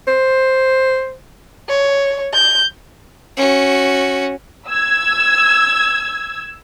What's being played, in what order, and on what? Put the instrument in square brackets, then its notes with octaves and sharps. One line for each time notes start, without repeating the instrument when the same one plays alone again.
[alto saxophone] C5
[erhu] C#5
G6
[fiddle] C#4 F#4
[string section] E6 G#6